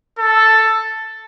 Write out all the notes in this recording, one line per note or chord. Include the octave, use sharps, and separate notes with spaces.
A4